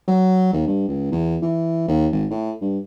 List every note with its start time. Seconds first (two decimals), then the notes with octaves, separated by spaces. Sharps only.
0.08 F#3
0.53 D#2
0.67 G2
0.88 C#2
1.12 E2
1.42 E3
1.88 D#2
2.12 G#1
2.31 A2
2.62 G2